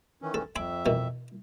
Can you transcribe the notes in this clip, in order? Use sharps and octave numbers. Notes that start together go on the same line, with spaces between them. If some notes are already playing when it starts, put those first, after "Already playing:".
D#3 E3 C#4
A4
F2 E5 G#5 B5 D6
B2 D#3 E3